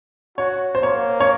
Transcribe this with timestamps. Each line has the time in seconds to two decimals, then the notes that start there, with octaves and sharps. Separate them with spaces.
0.38 F#4 C#5
0.75 C5
0.83 A#3 C#5
1.20 C#5